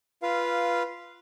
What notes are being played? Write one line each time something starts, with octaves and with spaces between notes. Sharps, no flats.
F4 B4 F5